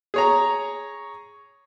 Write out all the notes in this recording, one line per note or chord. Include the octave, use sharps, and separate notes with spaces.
G#4 C#5 A#5